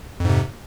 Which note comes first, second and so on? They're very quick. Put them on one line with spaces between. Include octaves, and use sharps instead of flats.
F2 G#2 C3